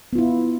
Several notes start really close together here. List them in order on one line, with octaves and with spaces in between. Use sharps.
B3 F4 E4